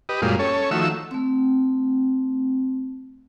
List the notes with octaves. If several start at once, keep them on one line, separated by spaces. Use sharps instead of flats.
G4 B4 D#5
F#2 A#2 G3 G#3 F4
C#4 A4 C#5
D#3 F3 A3 F#4 E5 E6
A3 C4